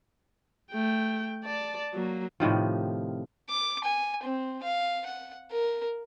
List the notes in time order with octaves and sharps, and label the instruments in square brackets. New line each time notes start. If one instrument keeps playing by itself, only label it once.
[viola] A3 G5
D5 A5
F#3 A#3
[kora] A2 C3 D#3 F3
[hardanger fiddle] D6
G#5
C4
F5
F#5
A#4